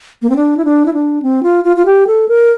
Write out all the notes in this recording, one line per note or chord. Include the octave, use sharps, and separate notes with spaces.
A#3
C4
D4
E4
D4
E4
D4
C4
F4
F4
F4
G4
A4
A#4